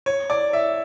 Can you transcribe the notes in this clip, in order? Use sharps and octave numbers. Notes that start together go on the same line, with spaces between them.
C#5
D5
E5